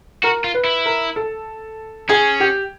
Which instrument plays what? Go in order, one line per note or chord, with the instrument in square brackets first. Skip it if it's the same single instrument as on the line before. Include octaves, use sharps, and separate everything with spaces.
[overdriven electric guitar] F#4 [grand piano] A#4
[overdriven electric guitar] F4
[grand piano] B4
[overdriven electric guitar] E4
[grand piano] A#4
A4
[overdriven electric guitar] C#4 [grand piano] G#4
[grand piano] G4